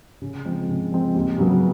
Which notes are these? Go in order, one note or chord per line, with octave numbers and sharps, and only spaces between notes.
C#3
F3 G#3 C4
C#3
F3 G#3 C4
D#2
C#3 F#3 B3